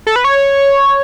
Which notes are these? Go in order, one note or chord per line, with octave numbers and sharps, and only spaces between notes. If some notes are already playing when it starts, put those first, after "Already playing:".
A4
B4
C#5